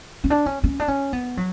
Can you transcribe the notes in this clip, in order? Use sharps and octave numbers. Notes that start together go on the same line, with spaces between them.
C#4
D4
C#4
C#4
D4
C#4
B3
F#3